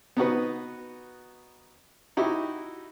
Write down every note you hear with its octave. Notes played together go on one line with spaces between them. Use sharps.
B3 D#4 F#4 B4
D#4 E4 F#4 G4